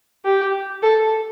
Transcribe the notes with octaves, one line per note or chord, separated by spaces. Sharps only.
G4
A4